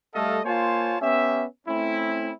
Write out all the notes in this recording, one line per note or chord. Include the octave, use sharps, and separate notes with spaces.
G3 A3 A4 D#5 F5
A#3 F4 C5 C#5 G#5 A5
B3 C#4 G4 E5
A3 C4 C#4 E4